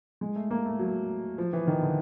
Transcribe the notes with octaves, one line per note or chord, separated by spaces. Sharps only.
G#3
A3
A#3
A3
F#3
F3
E3
D#3
D3